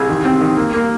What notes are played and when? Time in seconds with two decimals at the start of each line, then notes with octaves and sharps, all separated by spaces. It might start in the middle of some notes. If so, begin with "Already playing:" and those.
Already playing: C2 G#4
0.09 D#3
0.25 C4
0.41 D#3
0.57 A#3
0.74 A#3